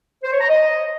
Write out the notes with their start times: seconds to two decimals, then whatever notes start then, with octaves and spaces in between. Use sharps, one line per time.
0.24 C5
0.32 C#5
0.41 A#5
0.49 D#5